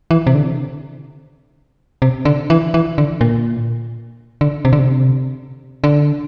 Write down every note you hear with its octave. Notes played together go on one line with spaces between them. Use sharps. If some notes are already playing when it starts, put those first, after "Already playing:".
E3
C3
D3
C3
D3
E3
E3
D3
A#2
D3
C3
D3
C3
D3